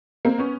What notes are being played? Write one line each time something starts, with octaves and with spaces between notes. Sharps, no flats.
A#3 C4
B3 C#4